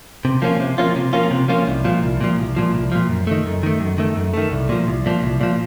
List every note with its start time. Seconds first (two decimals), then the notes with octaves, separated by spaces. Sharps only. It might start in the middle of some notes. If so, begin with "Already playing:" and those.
0.25 C3
0.42 F3 A#3 C#4 F4
0.60 C3
0.78 F3 A#3 C#4 F4
0.96 C3
1.13 F3 A#3 C#4 F4
1.31 C3
1.48 F3 A#3 C#4 F4
1.68 C2
1.84 A#2 F3
2.03 C2
2.21 A#2 F3
2.39 C2
2.56 A#2 F3
2.74 C2
2.92 A#2 F3
3.09 F#2
3.27 D#3 A3
3.46 F#2
3.63 D#3 A3
3.80 F#2
3.98 D#3 A3
4.17 F#2
4.34 D#3 A3
4.52 C2
4.69 A#2 F3
4.87 C2
5.06 A#2 F3
5.23 C2
5.41 A#2 F3